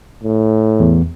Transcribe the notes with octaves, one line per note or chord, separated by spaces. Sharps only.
A2
E2